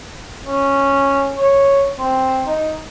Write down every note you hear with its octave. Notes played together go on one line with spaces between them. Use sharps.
C#4
C#5
C4
D#4